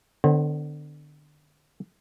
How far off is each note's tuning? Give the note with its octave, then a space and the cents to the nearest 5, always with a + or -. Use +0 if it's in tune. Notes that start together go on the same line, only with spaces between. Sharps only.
D3 +25 C4 -45 C5 +40